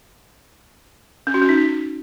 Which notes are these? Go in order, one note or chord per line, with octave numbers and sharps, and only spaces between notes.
C#4
F#4
C#4
D#4